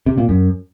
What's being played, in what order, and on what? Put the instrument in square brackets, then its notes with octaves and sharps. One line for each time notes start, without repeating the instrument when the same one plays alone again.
[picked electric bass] C3
A#2
F#2